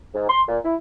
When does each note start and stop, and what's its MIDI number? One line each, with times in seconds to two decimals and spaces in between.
0.14 0.26 44
0.28 0.41 84
0.48 0.57 46
0.63 0.75 64